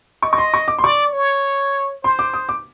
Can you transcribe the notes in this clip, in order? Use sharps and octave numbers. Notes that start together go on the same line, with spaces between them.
D#5 C#6
C#6
C6
C#6
D6
C6
D5 C#6
C#5
C5 C6
D6
D#6
D6